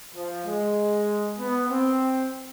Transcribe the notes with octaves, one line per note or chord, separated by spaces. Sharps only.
F3
G#3
B3
C4